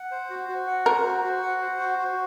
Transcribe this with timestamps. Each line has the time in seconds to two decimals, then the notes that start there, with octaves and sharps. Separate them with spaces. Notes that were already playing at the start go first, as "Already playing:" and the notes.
Already playing: F#5
0.11 C5
0.30 F#4
0.49 F#4
0.67 F#5
0.86 A#4 C5
1.05 F#4
1.24 F#4
1.43 F#5
1.61 C5
1.80 F#4
1.99 F#4